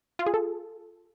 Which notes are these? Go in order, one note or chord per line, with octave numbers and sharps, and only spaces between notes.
F4
G#4
A4